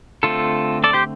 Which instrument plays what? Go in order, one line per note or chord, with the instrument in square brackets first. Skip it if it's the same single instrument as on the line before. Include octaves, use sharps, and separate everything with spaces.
[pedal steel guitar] D3 A3 C4 F4 A4
A4 D5
G4 C5